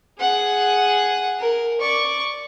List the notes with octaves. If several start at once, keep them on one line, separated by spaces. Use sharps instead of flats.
G#4 F#5
A#4
D5 C#6